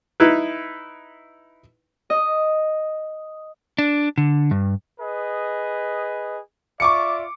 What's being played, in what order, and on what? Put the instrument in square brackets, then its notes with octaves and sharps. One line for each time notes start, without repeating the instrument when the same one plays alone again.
[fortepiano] D#4 E4 B4
[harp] D#5
[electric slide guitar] D4
D3
G2
[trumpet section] G#4 B4 D#5
[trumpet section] F4 D5 E5 [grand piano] C#6 D6 C#7